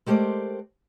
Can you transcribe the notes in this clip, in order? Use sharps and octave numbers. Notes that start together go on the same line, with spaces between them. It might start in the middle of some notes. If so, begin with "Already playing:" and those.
G#3 A3 G4 A#4 C5 D5